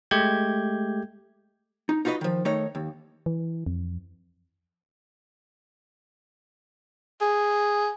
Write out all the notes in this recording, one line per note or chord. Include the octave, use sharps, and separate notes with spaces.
G#3 A3 G4 G6 G#6
D#4
D#4 F4 F#4 B4 D#5
D#3 F3
D#3 A3 D#4 C#5 D#5
D#2
E3
F2
G#4